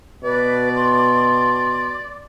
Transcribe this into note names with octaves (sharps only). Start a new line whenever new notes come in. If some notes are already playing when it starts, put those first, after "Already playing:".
B2 B4 D5
C6